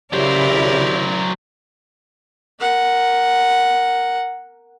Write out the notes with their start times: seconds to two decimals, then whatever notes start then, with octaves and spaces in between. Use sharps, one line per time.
0.13 C#3 F#3 E4 G4 A#4 C5 D5
2.60 A#4 F#5